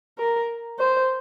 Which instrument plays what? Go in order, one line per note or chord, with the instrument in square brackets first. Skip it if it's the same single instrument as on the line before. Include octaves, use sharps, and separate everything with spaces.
[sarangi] A#4
C5